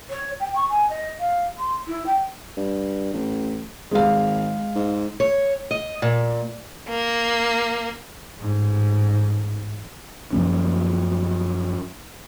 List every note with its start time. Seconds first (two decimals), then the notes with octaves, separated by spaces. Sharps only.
0.10 C#5
0.40 G5
0.55 C#6
0.69 G#5
0.89 D#5
1.19 F5
1.58 C6
1.87 E4
2.06 G5
2.57 G2
3.14 A1
3.91 G#1 G#3 F5
4.75 G#2
5.20 C#5
5.71 D#5
6.02 A#2
6.89 A#3
8.37 A1 G#2
10.33 F#2 F3 A#3 C#4